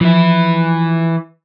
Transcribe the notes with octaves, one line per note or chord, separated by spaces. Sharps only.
E3 F3 E4